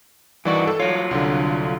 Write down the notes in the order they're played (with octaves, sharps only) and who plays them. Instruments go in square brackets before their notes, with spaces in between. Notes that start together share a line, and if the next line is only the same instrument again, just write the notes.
[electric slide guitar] G2 D#3 F#4 [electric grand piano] E3 D5
[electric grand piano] A4
[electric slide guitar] F#3 F4 [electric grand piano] C#5
[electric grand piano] C2 D3